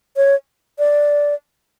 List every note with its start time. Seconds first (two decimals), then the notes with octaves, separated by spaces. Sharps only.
0.17 C#5
0.79 D5